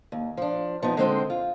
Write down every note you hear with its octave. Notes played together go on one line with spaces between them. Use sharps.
D#2
F3 D4
F3 B3 D#4
D3 G#3 C4 C5 D#5
F4